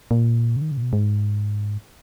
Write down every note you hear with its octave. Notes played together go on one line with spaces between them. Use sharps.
A#2
C#3
D#3
C#3
A#2
B2
G#2